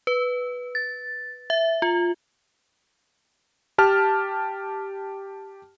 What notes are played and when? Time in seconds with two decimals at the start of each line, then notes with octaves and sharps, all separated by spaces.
0.07 B4
0.75 A6
1.50 E5
1.82 F4
3.78 G4 A5 F6